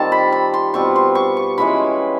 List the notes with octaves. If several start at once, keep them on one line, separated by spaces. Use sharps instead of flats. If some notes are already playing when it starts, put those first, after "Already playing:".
Already playing: D#3 G3 C4 F4 A5
B5
B5
C6
B2 G3 C4 F4 C#6
C6
C#6
C#6
E3 G#3 C#4 F4 B5